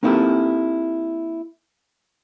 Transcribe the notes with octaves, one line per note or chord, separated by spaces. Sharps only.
A#3 C4 D#4 E4 G4 A4